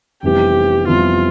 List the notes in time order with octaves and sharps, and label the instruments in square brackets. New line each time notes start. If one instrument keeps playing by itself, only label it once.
[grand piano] F1 F2 E3 G3 B3 [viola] G4
[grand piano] F1 F2 E3 G3 B3 [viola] F4